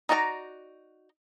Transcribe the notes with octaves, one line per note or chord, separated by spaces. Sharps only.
D#4 F#4 D5 A5 A#5